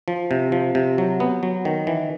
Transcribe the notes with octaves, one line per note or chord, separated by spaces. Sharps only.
F3
C3
F3
C3
F#3
B3
F#3
D#3
E3